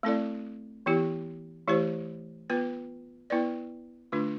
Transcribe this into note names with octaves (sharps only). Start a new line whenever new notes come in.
A3 C4 E4 A4 D5
E3 B3 E4 G4
E3 A3 E4 G4 C5
B3 F4 B4
B3 E4 B4 D5
D3 A3 D4 F4